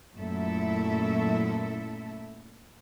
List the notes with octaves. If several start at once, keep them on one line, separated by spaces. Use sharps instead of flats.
F#2 A#2 A3 E4 A4 E5